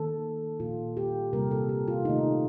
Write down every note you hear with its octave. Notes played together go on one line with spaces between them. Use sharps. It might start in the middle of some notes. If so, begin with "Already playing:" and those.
Already playing: D#3 A#3 A4
A#2 F3 A#3 F4
G4
C3 G3 A#3 A#4
A4
G4
F4
C3 D#3 A3 D#4